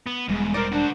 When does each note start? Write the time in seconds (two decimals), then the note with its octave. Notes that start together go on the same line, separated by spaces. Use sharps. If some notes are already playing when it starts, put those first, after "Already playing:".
0.07 B3
0.29 E1 E2 G#2 G3 G#3
0.54 C4 D#4 A#4 D5
0.72 D4 F#4 C5